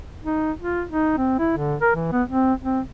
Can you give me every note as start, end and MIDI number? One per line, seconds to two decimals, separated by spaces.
0.24 0.52 63
0.61 0.83 65
0.89 1.13 63
1.17 1.37 60
1.39 1.53 64
1.57 1.76 50
1.81 1.91 70
1.95 2.09 52
2.12 2.22 59
2.28 2.53 60
2.64 2.80 60